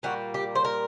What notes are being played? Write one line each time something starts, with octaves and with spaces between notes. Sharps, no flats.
A#2 G3 A#3 F#4
G4
C5
A#4